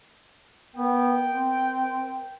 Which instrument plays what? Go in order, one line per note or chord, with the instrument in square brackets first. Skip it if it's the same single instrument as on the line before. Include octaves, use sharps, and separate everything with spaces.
[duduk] B3 [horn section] A#4 G5
[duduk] C4